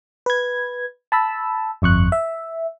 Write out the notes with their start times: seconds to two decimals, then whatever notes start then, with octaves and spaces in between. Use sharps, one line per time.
0.26 B4 G#6
1.12 A5 B5 E6
1.82 G1 F2 C#6 F#6
2.12 E5